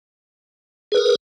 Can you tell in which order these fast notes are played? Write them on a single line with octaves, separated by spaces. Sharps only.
G#4 B4 A#4